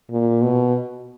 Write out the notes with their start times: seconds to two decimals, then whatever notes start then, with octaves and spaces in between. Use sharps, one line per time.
0.11 A#2
0.42 B2